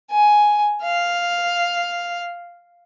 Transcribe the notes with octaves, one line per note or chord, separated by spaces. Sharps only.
G#5
F5